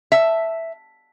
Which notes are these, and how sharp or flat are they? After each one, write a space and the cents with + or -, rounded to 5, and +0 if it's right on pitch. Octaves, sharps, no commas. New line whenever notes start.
E5 +0 A5 +0